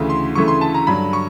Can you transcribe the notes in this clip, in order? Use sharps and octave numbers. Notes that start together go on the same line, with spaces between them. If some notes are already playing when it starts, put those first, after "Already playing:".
Already playing: D2 C#3 E3 A3
C6
D2 C#3 E3 A3 C#6
C6
A5
A#5
G2 D3 F#3 B5
C#6